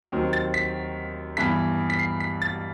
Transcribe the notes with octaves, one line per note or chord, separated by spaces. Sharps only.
D#2 D#3 F#3 C4
A6
B6
G2 E3 B3 B6
B6
C7
B6
A6